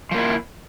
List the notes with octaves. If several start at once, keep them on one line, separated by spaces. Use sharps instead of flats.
F3 A#3 E4